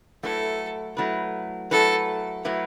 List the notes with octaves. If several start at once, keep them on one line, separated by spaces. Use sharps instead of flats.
F#3 A3 E4 A4 B4
F#3 A3 E4 B4
F#3 A3 E4 A4 B4
F#3 A3 E4 B4